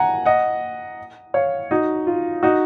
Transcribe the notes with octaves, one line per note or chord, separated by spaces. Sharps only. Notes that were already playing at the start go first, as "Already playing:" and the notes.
Already playing: F#5 G#5 A#5
D#5 F#5
C#5 F5
D#4 F#4
F4
D#4 F#4